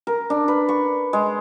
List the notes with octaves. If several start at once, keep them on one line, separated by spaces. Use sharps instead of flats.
A#4
D4
B4
C#6
G#3